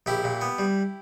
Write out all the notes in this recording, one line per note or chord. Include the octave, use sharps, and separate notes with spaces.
A#1 E4 G4
A#2
B3
G3